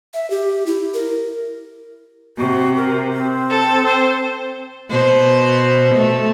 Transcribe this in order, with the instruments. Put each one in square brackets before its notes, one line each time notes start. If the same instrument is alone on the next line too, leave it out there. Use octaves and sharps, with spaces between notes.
[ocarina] E5
G4
E4
A#4
[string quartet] C3 [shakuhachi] F#4
[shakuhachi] A#4
C4
[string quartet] A4
C5
[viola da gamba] B2 C5
A3